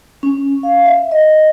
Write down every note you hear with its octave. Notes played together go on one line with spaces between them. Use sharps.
C#4
F5
E5
D#5